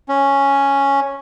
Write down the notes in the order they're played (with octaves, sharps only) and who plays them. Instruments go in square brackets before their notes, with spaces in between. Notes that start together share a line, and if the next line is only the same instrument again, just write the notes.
[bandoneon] C#4